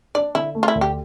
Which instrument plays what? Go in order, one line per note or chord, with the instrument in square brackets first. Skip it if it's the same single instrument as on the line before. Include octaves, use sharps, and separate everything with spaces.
[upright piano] D4 [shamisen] D5
[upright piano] D3 [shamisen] E4
[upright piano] A3
[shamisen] F4
E4
[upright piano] D2
[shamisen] G4